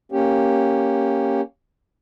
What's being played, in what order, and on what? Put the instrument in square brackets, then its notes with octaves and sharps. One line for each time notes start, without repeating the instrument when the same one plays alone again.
[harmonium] A#3 C#4 G4